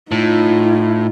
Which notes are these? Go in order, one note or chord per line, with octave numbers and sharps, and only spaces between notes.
A2 D#4 F4